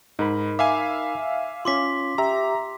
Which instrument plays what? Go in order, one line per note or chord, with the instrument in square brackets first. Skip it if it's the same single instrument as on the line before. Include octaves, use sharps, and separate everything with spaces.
[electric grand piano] G#2 [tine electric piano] D#4 A#4 B5
[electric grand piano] E5 F5 G#5 [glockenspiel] D6
[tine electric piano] C#4 F4 [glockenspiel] C6 D6 B6
[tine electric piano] G4 E5 [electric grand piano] A#5